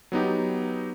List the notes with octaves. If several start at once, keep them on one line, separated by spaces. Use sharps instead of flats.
F#3 B3 D#4 G4